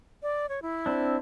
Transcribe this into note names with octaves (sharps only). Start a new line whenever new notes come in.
D5
C#5
E4
C4 D4